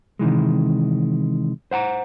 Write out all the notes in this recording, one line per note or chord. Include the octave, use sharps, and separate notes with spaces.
C3 D#3 E3 G#3
C5 F#5 A5 A#5